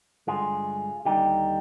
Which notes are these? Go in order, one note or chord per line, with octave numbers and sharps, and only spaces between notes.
G2 D3 G#3 F4 G#4
D#2 D3 G3 D#4 G4